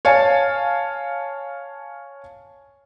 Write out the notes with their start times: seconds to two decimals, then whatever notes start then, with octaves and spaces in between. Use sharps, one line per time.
0.05 C#5 F5 G#5 A5